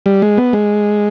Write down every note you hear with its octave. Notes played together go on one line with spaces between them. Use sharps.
G3
G#3
B3
G#3